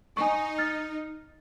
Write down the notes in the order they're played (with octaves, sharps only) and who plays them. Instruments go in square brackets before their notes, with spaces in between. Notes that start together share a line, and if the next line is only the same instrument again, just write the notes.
[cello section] D#4 [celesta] G#5 C#6
[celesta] F6 A6